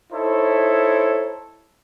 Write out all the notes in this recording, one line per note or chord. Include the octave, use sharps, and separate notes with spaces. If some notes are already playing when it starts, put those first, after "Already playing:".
D#4 E4 A4 C5 C#5